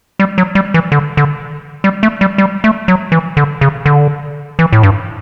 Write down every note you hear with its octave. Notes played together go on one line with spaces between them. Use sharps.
G3
F#3
G3
E3
D3
D3
G3
A3
G3
G3
A3
F#3
E3
D3
C#3
D3
E3
A2
G2